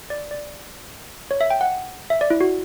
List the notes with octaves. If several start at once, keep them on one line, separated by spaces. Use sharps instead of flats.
D5
D5
C#5
E5
G5
F#5
E5
D5
E4
F#4